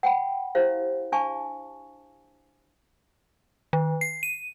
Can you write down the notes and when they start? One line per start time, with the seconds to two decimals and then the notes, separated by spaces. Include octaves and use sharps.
0.03 F#5 G5 B5
0.55 E4 G4 C5 F5
1.12 D4 F5 G#5 A5 C#6
3.73 D#3
4.01 C7
4.23 D#7